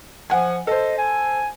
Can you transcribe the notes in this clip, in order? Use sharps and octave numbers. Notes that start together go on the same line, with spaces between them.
F3 F#5 G#5
A4 C5 D#5
G#5